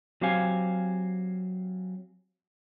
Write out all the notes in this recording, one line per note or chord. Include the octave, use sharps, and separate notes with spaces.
F#3 C4 G4 C5 F5 G#5